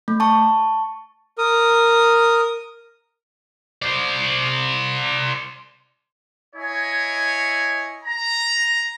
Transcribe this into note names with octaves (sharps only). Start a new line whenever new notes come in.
A3
A5 C#6
A#4 D#6
C5 D5
E4 C#5 D#5 G#5
A#5